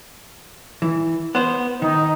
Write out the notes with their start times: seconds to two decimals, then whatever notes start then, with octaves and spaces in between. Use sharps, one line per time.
0.82 E3
1.35 B3 C5
1.82 D#3 D#4